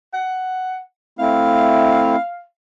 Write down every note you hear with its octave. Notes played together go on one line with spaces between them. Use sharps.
F#5
A3 C4 E4 F5